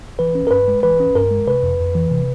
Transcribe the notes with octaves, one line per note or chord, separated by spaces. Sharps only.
E3 B4
C#4
A#4
G2 B4
G#3
E3 B4
C#4
G2 A#4
G#3
C3 B4
F2
F2
E3
C3